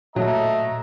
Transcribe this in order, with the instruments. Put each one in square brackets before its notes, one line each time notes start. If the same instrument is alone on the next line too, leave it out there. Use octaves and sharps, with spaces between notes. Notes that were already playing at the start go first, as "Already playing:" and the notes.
[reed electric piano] A#2 [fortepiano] F#3 [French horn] A3 [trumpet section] D#5 A#5